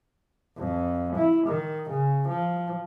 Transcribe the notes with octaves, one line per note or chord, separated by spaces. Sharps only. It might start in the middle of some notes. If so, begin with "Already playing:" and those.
F2
E4
D#3
C#3
F3